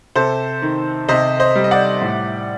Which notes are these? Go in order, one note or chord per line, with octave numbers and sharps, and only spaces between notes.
C3 A4 C5
D#3
C3 C5 D#5
C5 D#5
G3
D#5
D5 F#5
A2